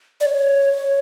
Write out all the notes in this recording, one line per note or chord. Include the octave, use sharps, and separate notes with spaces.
D5
C#5